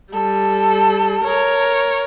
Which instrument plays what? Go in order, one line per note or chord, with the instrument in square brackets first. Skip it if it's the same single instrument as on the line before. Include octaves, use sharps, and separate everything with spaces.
[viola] G3 [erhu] A4
[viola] A#4 C#5